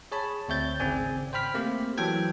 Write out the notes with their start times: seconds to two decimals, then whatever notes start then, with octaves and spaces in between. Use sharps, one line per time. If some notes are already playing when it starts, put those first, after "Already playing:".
0.12 G#4 C#5 A5 B5
0.48 D2 C4 C#5 E5 G6 A6
0.80 G#1 C#3 C4 D5 G#5
1.33 C5 G5 B5 F6 B6
1.54 A3 A#3 C4 G4
1.98 E3 F#3 A4 G5 G#6